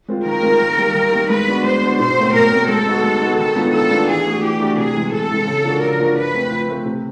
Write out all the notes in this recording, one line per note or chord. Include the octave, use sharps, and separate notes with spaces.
G#3 C4 F4
D#3 A#4
G#3 C4 F4
D#3
G3 A#3
D#3
G3 A#3
G#3 B4
B3 D4 F#4
G#3 C5
B3 D4 F#4
B2 C5
F#3 A3 C4
B2 A#4
F#3 A3 C4
G#3 A4
B3 D#4 F#4
G#3
B3 D#4 F#4
D#3 A4
G#3 B3 D4 F4
D#3 A4
G#3 B3 D4 F4
E3 G#4
A3 D4 F#4
E3 G4
A3 D4 F#4
C3 G#4
E3 G#3
C3 A4
E3 G#3
C#3
F3 A#3 D4 F#4
C#3 A#4
F3 A#3 D4 F#4
F3 B4
A3 C4
F3
A3 C4
C3